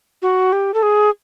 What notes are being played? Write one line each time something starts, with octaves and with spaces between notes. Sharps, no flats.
F#4
G4
A4
G#4